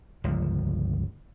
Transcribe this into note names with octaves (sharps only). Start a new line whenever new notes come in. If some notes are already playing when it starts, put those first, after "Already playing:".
G1 C#2 F3